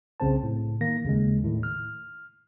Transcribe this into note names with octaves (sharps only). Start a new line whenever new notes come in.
C2 C#3 C4 C5 A5
A2
D#3 A#3 A#6
D#2 C#3 G#3
A2 D#3
F6